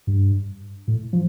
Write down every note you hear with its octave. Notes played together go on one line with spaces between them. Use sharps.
G2
A2
F3